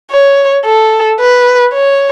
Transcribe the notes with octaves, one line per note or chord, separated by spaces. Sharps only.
C#5
A4
B4
C#5